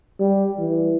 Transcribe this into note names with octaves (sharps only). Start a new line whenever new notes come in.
G3
E3